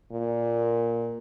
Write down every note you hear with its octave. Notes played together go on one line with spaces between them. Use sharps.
A#2